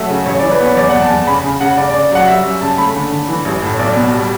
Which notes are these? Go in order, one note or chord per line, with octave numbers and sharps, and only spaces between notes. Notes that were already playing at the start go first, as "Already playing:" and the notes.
Already playing: F#3 A3 E5
C#3
A1 C#5
E3 D5
B4
B3 C#5
E2 D5
E2 F#5
A5
E2
C#3 B5
C#3
C#3 F#5
C#3 D5
C#3 D5
F#3 F#5
G3 E5
F#2
C#3 A5
A3 B5
D3
D3
E3
A1
A2
B1 D5
B2
G3